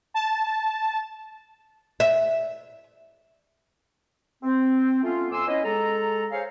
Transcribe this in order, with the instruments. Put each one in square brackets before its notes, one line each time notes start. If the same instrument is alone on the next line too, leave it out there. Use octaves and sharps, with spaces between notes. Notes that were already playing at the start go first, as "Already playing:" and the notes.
[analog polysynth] A5
[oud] E5
[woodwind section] C4
A3 B3 C#4 F4
F2 G#5 C6 D6 E6
B3 C#4 E4 C#5 D#5
G#3 A4 A#5
G#4 C5 C#5 F5